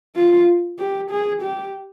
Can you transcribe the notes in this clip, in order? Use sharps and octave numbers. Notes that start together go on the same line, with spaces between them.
F4
G4
G#4
G4